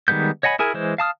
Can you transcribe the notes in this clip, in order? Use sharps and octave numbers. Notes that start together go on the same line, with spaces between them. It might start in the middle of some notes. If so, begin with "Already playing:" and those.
D#3 G3 G#3 B3 G6
C#5 D#5 F#5 G#5 B5
E4 G#4 A#4 G#5
E3 G#3 C5
F5 A5 D#6 F6